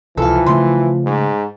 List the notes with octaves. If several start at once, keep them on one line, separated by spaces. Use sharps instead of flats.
C#2 C3 E3 F3 A4 F5
C#3 A3 C6
G#2